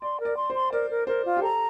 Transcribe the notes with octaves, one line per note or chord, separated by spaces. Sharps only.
D5 C6
A#4
D5
C6
C5
C6
A#4 D5
A#4
A#4 C5
F4
G4
A4 A#5